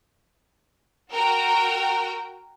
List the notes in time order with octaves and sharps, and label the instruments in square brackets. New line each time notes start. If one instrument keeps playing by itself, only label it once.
[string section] F#4 A#4 G5